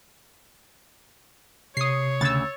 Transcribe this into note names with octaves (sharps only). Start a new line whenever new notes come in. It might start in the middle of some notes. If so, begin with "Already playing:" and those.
C3 C#5 D#6 C7
D2 C#3 E6 A6